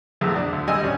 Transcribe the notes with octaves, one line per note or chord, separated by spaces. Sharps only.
A#1 E2 A3
D4
D2
G#1 G3 D#5 G#5 E6
C#4 D4